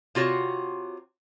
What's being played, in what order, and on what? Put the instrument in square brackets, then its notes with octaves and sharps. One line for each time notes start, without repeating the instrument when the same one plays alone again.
[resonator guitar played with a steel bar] C3 F4 F#4 C#5